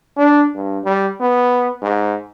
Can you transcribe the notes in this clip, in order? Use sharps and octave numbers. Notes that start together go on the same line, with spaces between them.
D4
G2
G3
B3
G#2